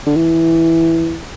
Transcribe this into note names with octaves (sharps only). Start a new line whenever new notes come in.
D3
E3